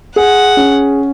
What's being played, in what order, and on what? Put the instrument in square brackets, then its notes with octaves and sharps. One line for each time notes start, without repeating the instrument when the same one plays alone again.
[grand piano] G#4 [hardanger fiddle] F#5
[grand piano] C#4